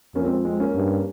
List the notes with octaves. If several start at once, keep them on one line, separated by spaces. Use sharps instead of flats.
F2 A#3 C#4
G#3 C4
G#3 C4
A#3 C#4
G2